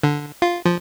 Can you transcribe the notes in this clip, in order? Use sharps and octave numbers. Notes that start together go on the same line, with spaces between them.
D3
F4
F3